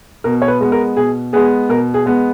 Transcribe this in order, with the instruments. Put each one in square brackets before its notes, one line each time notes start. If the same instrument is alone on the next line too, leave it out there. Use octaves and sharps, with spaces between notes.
[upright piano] B2 A#4
C#5
B4
G#3 B3
A#4
B2 G#4
G#3 B3 G#4
B2 A#4
G#4
G#3 B3